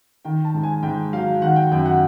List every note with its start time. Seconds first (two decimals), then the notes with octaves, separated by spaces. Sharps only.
0.25 D#3 G5
0.45 A5
0.54 G#2
0.63 G#5
0.83 G#2 G5
1.13 F#3 F5
1.42 D#3 F#5
1.56 G5
1.72 F#2 G5
1.86 F#5